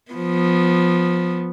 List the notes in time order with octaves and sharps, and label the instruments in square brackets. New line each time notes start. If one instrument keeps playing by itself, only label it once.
[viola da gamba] F3 B3